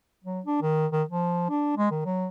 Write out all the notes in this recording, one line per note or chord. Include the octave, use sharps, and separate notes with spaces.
F#3
D4
D#3
D#3
F3
D4
G#3
D#3
F#3